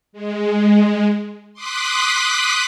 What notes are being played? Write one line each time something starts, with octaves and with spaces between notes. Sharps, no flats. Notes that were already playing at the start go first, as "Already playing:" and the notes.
G#3
C6 D6 D#6 F#6 B6